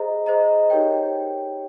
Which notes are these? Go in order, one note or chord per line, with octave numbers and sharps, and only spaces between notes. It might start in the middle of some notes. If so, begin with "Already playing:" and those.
Already playing: G#4 C5 D#5 A#5
G#4 C5 D#5 A#5
D#4 G4 A#4 C#5 G5